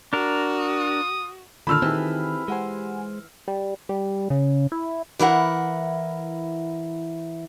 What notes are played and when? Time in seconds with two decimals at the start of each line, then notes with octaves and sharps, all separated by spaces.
0.13 D4 F#4 A#4
0.55 D#6
1.67 A#2 D3 D#3 D4 A4 B5 E6 F6
1.82 D#3 E3 C4 D#4 G4 G#4
2.48 G#3 G4 C5 F#5 G#5
3.48 G3
3.89 G3
4.30 C#3
4.72 E4
5.19 E3 E4 A#4 F#5